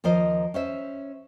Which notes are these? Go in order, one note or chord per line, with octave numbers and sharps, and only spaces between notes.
D#2 F3 A#4 C5 D#5
C#4 C5 E5